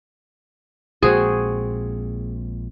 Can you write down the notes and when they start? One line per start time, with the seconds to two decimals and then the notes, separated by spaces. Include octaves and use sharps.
1.02 A#1 A#2 G#3 C4 F#4 G#4 C5